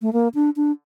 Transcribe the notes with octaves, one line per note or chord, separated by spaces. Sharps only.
A3
A#3
D4
D4